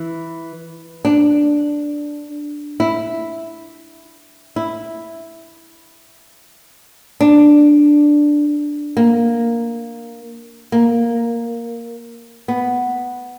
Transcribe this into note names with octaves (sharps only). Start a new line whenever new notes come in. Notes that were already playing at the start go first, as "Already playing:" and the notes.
Already playing: E3
D4
E4
E4
D4
A#3
A#3
B3